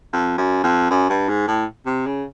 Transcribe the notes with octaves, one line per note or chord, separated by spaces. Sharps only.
F2
F#2
F2
F#2
G2
G#2
A2
C3
C#3